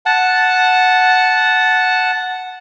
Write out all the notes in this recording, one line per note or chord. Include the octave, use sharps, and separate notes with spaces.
F#5 A5